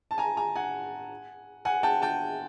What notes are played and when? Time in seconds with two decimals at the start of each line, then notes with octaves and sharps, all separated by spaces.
0.11 A5
0.18 G#5 A#5
0.37 G#5 A#5
0.55 F#5 G#5
1.65 F#5 G#5
1.83 G5 A5
2.02 G5 A5